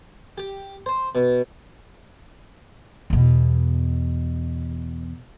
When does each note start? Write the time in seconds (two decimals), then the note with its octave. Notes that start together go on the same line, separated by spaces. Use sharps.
0.38 G4
0.86 C5
1.15 B2
3.10 E2 B2